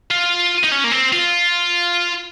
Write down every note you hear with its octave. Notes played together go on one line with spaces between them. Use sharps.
F4
D#4
C#4
A#3
C4
F4